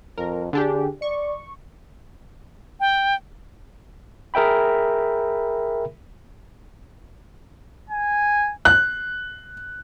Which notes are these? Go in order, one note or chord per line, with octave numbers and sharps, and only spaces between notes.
F2 A#4
D3 D4 G4 G#4
D5 C#6
G5
G#4 A#4 E5 G5 B5
G#5
F#6